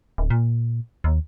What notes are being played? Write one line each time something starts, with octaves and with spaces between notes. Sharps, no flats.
D1
A#2
D#2